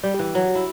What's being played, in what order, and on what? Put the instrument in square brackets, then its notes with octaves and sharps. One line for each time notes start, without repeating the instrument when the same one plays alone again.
[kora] G3 [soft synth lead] D5
[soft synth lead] G4
[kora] E3
[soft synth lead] G4
[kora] F#3 [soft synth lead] F#4
[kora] E4